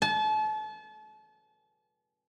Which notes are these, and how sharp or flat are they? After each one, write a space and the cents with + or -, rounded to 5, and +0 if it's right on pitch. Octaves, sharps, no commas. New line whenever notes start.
A5 -35